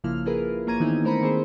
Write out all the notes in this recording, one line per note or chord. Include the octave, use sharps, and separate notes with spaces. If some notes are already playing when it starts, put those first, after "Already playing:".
A#1 C#3 F3 A#3 E4 F6
E4 F4 G#4 A#4 B4
G#1 A#3 C#4 A#5 G#6 D#7
D#3 E3 B3 C4 D#4 E4
A3 A#4 C5 A#5 B5 C#7
D#3 A#3 C4 G#4 C5